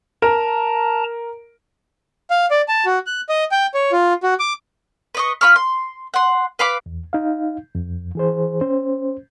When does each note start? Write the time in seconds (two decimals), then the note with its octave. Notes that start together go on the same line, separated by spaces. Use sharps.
0.22 A#4 A5 A#5
2.30 F5
2.51 D5
2.68 A5
2.86 F#4
3.06 F#6
3.29 D#5
3.52 G5
3.74 C#5
3.92 F4
4.23 F#4
4.40 D6
5.15 B4 D#5 C#6
5.41 F4 B5 C#6 F6
5.56 C6
6.14 F#5 C6
6.59 B4 F5 B5 D6
6.86 E2
7.13 D#4 F5
7.75 F2
8.15 E3 G#4 C5
8.61 C#4 C5